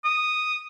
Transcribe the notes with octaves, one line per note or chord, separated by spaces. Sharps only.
D#6